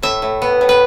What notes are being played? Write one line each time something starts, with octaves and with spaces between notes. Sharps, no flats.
A2 E5
A2
B3
A2
B4